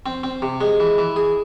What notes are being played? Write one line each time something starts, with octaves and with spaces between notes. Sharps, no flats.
C4
C4
C3
G#3
E3
E3
G#4